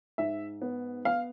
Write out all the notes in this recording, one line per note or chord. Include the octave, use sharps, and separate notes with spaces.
G#2 E5
B3
B3 F5